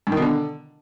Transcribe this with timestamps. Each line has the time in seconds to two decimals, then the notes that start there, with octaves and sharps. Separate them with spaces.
0.07 G2
0.12 D#3
0.17 B2
0.22 D3